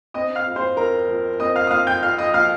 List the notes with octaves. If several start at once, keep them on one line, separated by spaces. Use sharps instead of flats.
C4 D#5 D#6
F5 F6
F2
C5 C6
F2 A#4 A#5
F3
C4 D#5 D#6
F5 F6
D#6
F2 F5 F6
G5 G6
F2 F5 F6
D#5 D#6
F3 F5 F6